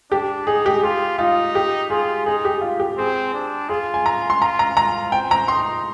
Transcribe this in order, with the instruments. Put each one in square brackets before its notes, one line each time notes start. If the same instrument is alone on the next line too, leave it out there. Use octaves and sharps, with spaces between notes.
[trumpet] D4 [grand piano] G4
[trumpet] D#4 [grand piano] G#4
[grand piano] G4
[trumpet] F4 [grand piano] G4
[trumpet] D#4 [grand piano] F4
[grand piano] G4
[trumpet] F4 [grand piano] G#4
[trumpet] D#4 [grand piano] G#4
[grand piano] G4
F4
G4
[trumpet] C4 [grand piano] G#4
[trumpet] D4
[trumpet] F4 [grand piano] G#4
[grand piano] G#5
A#5
C6
[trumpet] F4 [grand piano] A#5
[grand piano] A#5
[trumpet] F4 [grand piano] A#5
[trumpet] C4 [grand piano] G5
[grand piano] A#5
[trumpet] D#4 [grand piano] C6